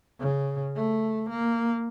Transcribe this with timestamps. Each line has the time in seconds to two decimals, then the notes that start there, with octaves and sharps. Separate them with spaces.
0.20 C#3
0.76 A3
1.30 A#3